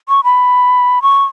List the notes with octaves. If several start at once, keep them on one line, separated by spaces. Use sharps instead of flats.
C#6
B5
C#6